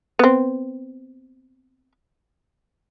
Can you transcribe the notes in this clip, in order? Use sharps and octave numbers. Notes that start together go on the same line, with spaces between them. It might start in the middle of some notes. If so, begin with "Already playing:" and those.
B3 C4